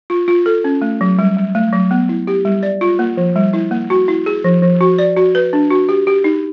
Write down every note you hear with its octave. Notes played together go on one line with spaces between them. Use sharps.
F4
F4
A4
C#4
A3
F#3
G3
G3
A3
F#3
B3
E4
G4
G3
D5
F4
A#3
F3
G3
E4
A#3
F#4
E4
G#4
F3
F3
F#4
D5
F#4
B4
D4
F#4
G4
G4
D#4